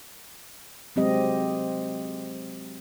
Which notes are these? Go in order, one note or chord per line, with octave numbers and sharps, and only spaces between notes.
F#3 G#3 C4 G4 D#5